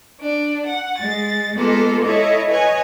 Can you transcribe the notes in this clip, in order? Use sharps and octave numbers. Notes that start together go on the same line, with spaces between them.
D4
F#5
G#3 A6
G#3 A#3 B3 F4 A4
E4 A4 C#5 D#5
B4 C#5 D#5 G#5